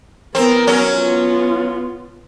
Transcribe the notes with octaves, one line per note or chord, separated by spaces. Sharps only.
B3 C4 A#4
F#3 C#4
B3 F4